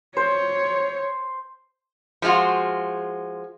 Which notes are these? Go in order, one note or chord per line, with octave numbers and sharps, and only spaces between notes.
C5 C#5
F3 G#3 F4 F#4